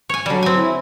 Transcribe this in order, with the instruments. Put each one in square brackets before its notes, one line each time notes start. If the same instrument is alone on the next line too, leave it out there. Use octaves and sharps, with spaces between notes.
[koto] C#5 G#5
[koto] D3 G3 [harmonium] F#3
[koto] C4 G#5
[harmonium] E4